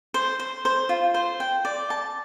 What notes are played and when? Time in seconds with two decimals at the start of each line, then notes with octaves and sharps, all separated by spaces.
0.14 C5
0.39 C5
0.65 C5
0.89 F4
1.14 C5
1.40 G5
1.65 D5
1.90 A5